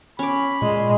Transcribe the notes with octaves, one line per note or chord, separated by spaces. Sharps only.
C#4 B5 D6
A#2 G#3